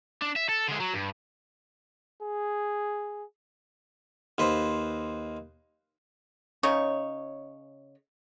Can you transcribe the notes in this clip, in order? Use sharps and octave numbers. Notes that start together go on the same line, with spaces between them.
D4
E5
A4
D3 G#3
F#3
G2
G#4
D#2 B4 C5
C#3 D#4 C#5